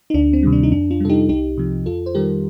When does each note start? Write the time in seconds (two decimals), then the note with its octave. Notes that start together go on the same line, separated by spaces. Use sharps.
0.10 D#4
0.14 D2 D4
0.33 C4
0.43 C3 D#3 G3
0.53 D4
0.63 D#4
0.72 F2 D4
0.91 D4 F4
1.00 C3 G3 A4
1.10 D#4 G4
1.29 C2 D#4 G4
1.57 C3 F3
1.86 F2 F4 A4
2.06 C5
2.15 D#3 G3 G4 A#4